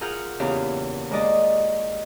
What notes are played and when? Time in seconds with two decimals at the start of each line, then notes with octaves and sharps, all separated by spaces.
0.01 F4 G#4 A#4 F#5 F6 G6
0.40 E2 A#2 C#3 E4 G4 F5
1.11 D#2 G#3 D5 D#5